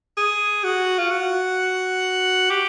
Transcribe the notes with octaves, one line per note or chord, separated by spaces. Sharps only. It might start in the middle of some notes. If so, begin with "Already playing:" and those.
G#4
F#4
F4
F#4
G4